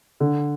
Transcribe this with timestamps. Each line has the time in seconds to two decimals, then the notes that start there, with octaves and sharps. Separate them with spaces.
0.20 D3